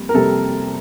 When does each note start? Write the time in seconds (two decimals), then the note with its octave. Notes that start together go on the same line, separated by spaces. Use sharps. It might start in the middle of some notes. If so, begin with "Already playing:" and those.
Already playing: F2 G3 A#3
0.09 A#4
0.14 F2 C3 G3 A#3 A4